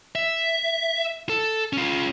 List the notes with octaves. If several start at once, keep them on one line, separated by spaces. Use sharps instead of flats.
E5
A4
C#4 F4